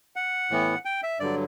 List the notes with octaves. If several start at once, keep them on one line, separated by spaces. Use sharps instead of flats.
F#5
A2 E3 B3
G5
E5
G2 D3 F#3 D5